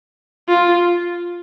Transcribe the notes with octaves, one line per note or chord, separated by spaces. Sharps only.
F4